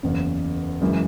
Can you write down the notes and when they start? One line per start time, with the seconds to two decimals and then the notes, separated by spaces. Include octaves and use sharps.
0.03 F#1 E2 C#3
0.81 F#1 F#2 C#3 E3 G#3